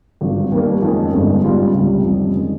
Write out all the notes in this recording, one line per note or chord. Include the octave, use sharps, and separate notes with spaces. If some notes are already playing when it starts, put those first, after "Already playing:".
G#1 G2 F3
D#2 D#3 G3 A#3
F2 D#3 G#3 C#4
G1 G2 D#3 G#3
G#2 G3 C#4 F4
C#2 C3 G3
F2 D#3 G3 C#4
D#3 G#3